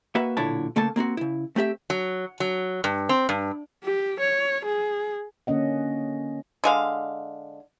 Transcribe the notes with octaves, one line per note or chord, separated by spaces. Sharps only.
A#3 F#4 B4 E5 F#5
B1 A#2 D3 E4 C#5 A5
C#3 A3 A#3 A4 A5
A#3 C4 F4 F#4
C#3 E4
A3 C4 G4 E5
F#3
F#3
G2
C4
G2
G4
C#5
G#4
D3 A#3 C#4 D#5 F#5
D3 G#3 F5